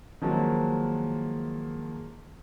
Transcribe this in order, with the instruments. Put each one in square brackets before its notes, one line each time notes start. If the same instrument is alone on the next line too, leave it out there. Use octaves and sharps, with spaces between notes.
[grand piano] D#3 F3 F#3 G#3 A#3